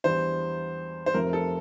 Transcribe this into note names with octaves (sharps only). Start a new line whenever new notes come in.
E2 E3 G3 D4 C5
C5
F1 F2 C3 F3 A#4
A4